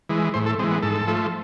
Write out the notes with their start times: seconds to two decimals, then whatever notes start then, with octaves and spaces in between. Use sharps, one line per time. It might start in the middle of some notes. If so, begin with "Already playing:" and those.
0.09 E3 G#3
0.34 A2 C5
0.46 A4
0.59 E3 G#3 C4
0.71 B3
0.83 G#2 A4
1.07 F3 A3